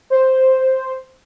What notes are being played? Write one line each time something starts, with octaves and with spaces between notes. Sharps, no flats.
C5